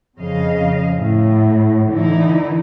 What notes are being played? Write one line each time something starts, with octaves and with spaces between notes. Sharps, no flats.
F2 C#3 D#5 F5
A2
D3 E3 D#4 E4